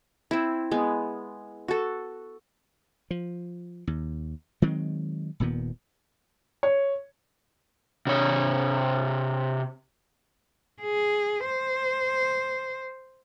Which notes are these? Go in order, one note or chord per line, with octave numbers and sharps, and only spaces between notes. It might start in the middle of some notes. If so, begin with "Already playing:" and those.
C4 E4
G#3 B3
F#4 A4
F3
D#2
D#3 F#3 G#3 C4
D#1 A#2 D#3 B3
C#5
C3 C#5
G#4
C5